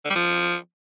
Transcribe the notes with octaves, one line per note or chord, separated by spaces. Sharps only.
D3
G3
F3